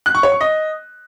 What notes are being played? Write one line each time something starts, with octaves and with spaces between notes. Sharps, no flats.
F#6
C#6
C#5
C#6
D#5